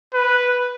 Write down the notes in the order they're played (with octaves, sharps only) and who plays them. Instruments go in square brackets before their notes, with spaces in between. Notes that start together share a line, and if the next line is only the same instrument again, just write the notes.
[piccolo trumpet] B4